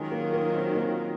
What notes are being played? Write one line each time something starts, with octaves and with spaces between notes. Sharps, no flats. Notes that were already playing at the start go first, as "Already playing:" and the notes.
Already playing: D#3 F#3 G#3 C#4 F4 A#4
A#3
A#3
C4
A#3